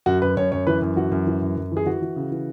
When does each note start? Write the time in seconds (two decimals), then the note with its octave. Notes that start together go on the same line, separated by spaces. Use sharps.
0.06 F#2 F#4
0.22 F#2 B4
0.37 F#2 C#5
0.52 F#2 C#5
0.67 E3 B4
0.82 F#2
0.96 E3 F#4
1.12 F#2
1.27 E3
1.42 F#2
1.57 F#2
1.72 E3 G#4
1.86 E3 F#4
2.02 E3
2.16 C#3
2.32 E3